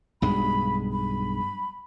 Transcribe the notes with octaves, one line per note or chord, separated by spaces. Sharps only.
B1 G2 G#3 B5
B5